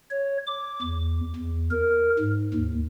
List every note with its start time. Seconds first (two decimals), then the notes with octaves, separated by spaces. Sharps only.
0.11 C#5
0.47 D6
0.82 E2
1.36 E2
1.71 A#4
2.19 G#2
2.54 D#2